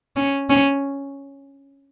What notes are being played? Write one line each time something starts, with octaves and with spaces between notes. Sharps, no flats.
C#4
C#4